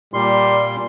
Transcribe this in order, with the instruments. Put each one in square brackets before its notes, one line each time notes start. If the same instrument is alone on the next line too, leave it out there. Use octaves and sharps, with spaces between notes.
[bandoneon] A#2 C6 [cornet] G3